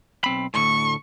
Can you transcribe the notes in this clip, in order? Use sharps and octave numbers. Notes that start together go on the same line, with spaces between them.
B1 C4 B5
D2 A2 C#6